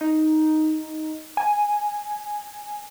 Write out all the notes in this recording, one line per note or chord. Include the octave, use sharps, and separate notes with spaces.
D#4
G#5